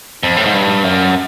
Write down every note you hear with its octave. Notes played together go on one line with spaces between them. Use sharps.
F2
A2
G#2
G2
F#2